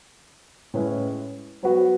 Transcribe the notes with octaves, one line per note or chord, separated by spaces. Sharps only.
A2 G#3 C#4 E4 B4
F#3 B3 F#4 B4